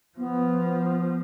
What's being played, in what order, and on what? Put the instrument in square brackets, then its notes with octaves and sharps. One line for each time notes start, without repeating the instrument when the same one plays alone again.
[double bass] F3 [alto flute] B3